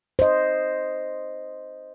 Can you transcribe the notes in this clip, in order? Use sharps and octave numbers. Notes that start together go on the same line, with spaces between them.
C5 D#5